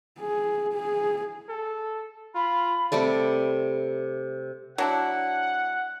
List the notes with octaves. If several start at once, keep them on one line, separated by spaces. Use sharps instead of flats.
G#4
G#4
A4
F4 B5
C3 G3 A3 D5
F#3 D4 E4 F#5